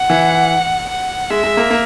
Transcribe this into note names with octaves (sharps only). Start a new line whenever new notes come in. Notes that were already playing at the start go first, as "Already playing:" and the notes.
Already playing: F#5
E3
F#5
G#3 E5
G#3
A#3
A#3